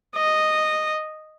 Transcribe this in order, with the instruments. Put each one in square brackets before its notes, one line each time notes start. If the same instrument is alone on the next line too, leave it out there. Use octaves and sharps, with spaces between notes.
[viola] D#5